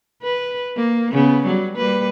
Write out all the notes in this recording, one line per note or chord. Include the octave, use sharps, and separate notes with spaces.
B4
A#3
C#3 B3
F#3 G3
G3 A#3 B4